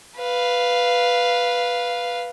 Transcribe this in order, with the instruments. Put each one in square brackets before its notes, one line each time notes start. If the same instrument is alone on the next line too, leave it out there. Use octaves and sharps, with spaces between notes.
[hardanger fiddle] B4 F5